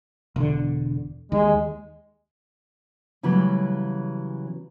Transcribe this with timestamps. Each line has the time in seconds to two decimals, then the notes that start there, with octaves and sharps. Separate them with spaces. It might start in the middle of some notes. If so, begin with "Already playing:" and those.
0.36 E1 D3
1.32 D#2 G#3
3.23 C#3 E3 F#3 G3 A3 B3